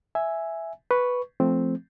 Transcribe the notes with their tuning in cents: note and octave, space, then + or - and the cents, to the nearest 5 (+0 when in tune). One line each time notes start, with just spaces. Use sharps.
E5 +0 G#5 +0
B4 +0 C#6 +0
F3 -5 A3 +0 C4 +0